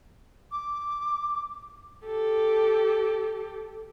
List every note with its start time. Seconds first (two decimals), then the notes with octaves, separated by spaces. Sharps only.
0.52 D6
2.06 G4 A4